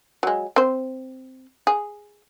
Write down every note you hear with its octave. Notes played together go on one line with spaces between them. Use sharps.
F#3 G#3
C4 C5
G#4